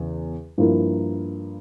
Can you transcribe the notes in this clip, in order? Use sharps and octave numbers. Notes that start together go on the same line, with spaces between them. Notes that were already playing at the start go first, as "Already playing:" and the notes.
Already playing: E2 C#3
G2 F3 A#3 E4